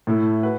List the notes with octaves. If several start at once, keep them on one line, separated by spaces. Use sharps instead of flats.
A2 A3 E4
F#4 B4